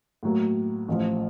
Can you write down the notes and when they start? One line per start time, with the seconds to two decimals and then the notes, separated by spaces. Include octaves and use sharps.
0.23 A2 F#3 A#3
0.88 A1 A2 F3